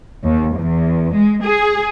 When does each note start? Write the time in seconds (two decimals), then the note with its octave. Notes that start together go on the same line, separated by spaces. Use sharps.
0.23 D#2
0.56 E2
1.13 G#3
1.42 G#4